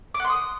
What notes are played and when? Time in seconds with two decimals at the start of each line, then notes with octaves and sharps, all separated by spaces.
0.14 D6
0.20 F#5
0.25 C6
0.30 D#6